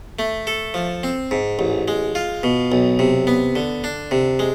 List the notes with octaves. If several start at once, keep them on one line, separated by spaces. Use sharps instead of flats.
A3
A4
F3
C4
G#2
A1
G#3
F4
B2
B1
C3
B3
D3
D4
C3
G#3